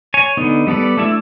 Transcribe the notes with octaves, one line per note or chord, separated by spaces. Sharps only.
C#5 G#5
D3 B3 D#4
G3 B3 A4 D5
A3 D4 E4 D5 E5